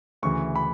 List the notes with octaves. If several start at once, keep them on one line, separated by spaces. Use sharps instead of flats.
D2 C#3 E3 C#6
B5